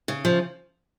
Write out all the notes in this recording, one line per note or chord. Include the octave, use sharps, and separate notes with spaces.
C#3
F3